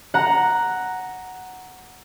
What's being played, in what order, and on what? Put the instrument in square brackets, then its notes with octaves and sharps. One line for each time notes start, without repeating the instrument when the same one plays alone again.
[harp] F#5 A#5